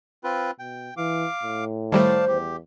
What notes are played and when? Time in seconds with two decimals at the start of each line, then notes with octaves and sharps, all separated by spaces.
0.24 C4 F4 B4
0.59 B2 G5
0.97 E3 F5 D6
1.43 A2
1.92 D#3 G3 A3 C5 D5 F5 A5
2.28 E2 G4